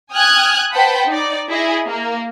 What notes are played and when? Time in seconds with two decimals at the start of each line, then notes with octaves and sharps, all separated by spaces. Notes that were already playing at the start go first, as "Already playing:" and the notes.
0.11 G5 G#5 D#6 F6 F#6 G#6
0.72 B4 C5 F#5 G5 A5 B5
1.07 D#4 D5
1.48 E4 G#4 D#5
1.86 A#3